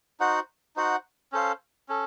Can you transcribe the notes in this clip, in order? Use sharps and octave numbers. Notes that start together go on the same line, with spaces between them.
D#4 F#4 C5 F#5
D#4 F#4 C5 F#5
C#4 A4 C5 F5
C#4 A4